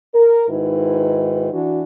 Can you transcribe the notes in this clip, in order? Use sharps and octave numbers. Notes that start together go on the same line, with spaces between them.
A#4
G#2 D#3 E4 F#4 B4
E3 D4 F#4